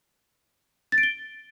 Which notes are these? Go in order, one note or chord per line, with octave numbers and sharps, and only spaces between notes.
A6
D7
G7